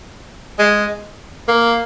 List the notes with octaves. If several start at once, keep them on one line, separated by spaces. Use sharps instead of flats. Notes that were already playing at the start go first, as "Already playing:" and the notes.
G#3
A#3